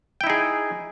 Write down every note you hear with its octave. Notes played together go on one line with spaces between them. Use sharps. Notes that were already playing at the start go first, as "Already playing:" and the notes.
D#4 E4 G#4 G5